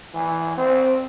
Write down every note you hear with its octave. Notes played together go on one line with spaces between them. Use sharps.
E3
C4